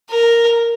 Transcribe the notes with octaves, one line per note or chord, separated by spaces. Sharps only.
A#4